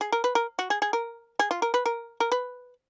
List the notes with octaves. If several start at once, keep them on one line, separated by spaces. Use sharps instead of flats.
G#4
A#4
B4
A#4
F#4
G#4
G#4
A#4
G#4
F4
A#4
B4
A#4
A#4
B4